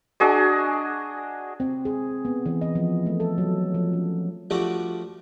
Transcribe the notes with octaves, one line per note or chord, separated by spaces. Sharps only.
D4 F#4 G#4 D#5
C4
G#4
B3
E3
D#5
F3
A3
A4
F#3
F3
C#4
F3 G3 A3 D4 F4 F#4